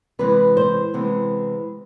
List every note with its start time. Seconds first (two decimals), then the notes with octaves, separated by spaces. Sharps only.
0.19 C3 E3 G#3 B4
0.57 C5
0.94 C3 E3 G#3 B3